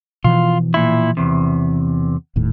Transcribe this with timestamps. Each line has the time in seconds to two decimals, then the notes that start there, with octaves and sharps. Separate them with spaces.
0.24 B2 E3 F3 F4
0.74 A#2 E4
1.17 E2 C3
2.36 D#1 D#2 A2